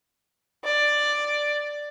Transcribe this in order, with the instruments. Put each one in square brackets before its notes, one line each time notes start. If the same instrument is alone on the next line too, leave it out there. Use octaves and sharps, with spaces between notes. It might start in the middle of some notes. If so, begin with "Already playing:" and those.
[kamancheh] D5